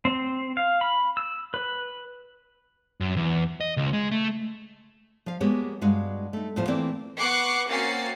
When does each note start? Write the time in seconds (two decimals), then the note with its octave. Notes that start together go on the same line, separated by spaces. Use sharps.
0.05 C4
0.57 F5
0.81 B5
1.17 E6
1.54 B4
3.01 F#2
3.17 E2
3.61 D#5
3.77 C#2
3.93 G#3
4.11 A3
5.26 F3 F5
5.40 G#3 A#3 B3 G4 B4 C#5
5.81 G2 G#3 F#4 F5
6.33 A3 D#4
6.56 E2 A2 F3 F4 C5
6.67 E3 A3 A#3 C4 E4 D5
7.19 B3 F#5 C#6 D6 F#6 C7
7.68 A#3 C4 C#4 F#4 A6 C7